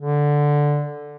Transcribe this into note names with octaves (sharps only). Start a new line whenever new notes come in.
D3